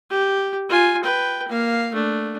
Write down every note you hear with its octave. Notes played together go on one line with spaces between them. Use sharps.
G4
F4 G#5
B4 G5
A#3 F5
A3 D4